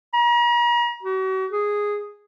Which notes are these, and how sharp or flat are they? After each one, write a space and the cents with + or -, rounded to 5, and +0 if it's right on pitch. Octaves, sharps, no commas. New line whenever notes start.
A#5 +40
F#4 +40
G#4 -5